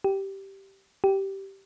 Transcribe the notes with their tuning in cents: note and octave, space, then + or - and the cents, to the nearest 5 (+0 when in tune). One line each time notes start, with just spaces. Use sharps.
G4 -10
G4 -10